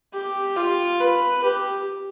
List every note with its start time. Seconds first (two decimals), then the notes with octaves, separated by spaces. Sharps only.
0.13 G4
0.56 F4
1.00 B4
1.44 G4